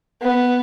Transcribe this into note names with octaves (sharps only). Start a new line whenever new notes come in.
B3